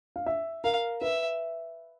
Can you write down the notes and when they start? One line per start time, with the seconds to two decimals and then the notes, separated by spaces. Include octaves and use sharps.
0.16 F5
0.26 E5
0.64 A#4 F5
1.01 B4 E5